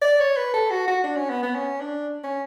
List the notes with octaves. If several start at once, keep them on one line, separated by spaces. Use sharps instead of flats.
D5
C#5
B4
A4
F#4
F#4
D4
C#4
B3
B3
C#4
D4
C#4